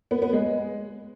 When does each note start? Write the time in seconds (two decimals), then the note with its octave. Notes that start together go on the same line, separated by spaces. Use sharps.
0.11 B3
0.22 B3
0.33 G#3